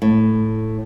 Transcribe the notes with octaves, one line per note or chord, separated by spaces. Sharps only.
A2